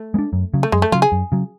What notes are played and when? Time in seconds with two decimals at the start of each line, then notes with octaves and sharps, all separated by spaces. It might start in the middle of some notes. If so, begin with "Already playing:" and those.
Already playing: A3
0.14 G#3 B3
0.19 D4
0.33 F#2
0.54 C#3 F#3
0.63 A3
0.72 F#2 G#3
0.82 A3
0.92 C#3 F#3 F4
1.02 G#4
1.12 F#2
1.32 C#3 F#3